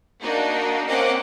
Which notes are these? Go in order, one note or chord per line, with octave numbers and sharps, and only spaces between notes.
A#3 D4 D#4 F#4 D#5
A#3 C4 C#4 D#5 F#5 D6